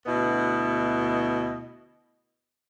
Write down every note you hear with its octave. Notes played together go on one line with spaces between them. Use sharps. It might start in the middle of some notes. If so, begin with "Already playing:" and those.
D2 B2 B3 E4 D#5